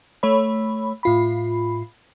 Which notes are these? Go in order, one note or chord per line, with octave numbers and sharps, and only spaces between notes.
A3 C#5 B5
A2 F4 B5